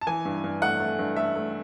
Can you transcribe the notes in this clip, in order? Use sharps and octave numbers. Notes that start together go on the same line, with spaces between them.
A5
E3 G#5
G2
G2
A3 F#5
A3
G2
A3 E5
A3